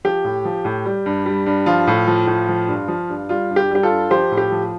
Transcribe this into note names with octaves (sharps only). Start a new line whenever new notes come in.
F3 G4
A2
F3
A2
G3
G2
G3
G2
F3 F4
A2
F3
A2
F3
G2
F3
G2
G3 F4
G2
G4
G3 G4
F4 A4
G2
F3 G4 C5
A2
G4
F3